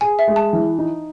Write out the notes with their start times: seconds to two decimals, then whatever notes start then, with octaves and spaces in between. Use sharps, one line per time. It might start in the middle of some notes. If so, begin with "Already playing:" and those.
0.01 G#4 G#5
0.19 E5
0.28 G#3
0.36 A5
0.53 E3
0.79 D#4